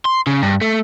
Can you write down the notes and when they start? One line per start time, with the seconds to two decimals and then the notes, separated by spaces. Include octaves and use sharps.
0.05 C6
0.27 C#3
0.42 G2
0.61 A3